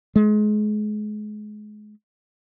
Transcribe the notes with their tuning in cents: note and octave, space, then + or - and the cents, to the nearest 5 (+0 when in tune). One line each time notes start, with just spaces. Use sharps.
G#3 +30